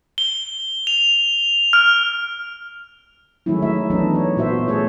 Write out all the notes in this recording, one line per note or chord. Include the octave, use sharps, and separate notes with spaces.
G7
F7
F6
D#3 F#3 G#3 A3 C#4 E4
D#4 E5
E3 F#3 B3 D4 D#4 A4
C#5
A#2 B3 F4 F#4 C5 E5
A3 G#4 A4 C#5